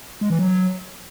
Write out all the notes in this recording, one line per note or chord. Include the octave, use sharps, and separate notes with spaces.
G#3
E3
F#3